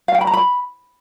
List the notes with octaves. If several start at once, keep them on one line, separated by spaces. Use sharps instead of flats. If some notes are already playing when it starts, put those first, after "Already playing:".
F5
G5
B5
A#5
B5